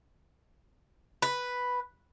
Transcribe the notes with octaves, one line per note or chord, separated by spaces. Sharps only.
B4